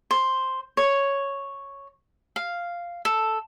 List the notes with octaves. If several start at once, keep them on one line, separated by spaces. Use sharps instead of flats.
C5
C#5
F5
A4